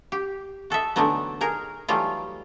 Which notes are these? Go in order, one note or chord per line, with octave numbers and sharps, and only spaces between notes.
G4
F#4 A4 D#5 E5
D3 E3 F#3 A3 B3 D#4
D#4 G#4 A#4
E3 F#3 G3 A3 D#4 F4